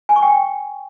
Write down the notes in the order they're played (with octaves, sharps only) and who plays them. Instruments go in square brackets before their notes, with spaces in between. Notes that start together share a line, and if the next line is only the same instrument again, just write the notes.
[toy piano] G#5
C#6
G5